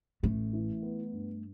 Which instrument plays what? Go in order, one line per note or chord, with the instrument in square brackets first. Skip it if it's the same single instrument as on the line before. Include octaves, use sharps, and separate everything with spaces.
[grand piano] A1 [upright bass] A3
[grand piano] E3
B3
G2